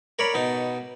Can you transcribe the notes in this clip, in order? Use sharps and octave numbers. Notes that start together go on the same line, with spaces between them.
A#4 C#5 D5 B5
B2 D#4 A5